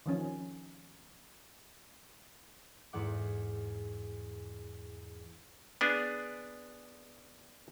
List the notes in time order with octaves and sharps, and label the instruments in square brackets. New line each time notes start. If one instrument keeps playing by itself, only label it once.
[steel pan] D#3 F3 C#4
[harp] E2 G#2 F#5 D6
[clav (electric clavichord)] B3 D4 G#4